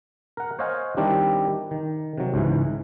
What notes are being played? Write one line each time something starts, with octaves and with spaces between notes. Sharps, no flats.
A#4 F#5
C5 C#5 D#5 F5 F#5 G#5
D#3 G3 C4 D4 E4 G4
D#3
C3 F#3
C#2 G#2 E3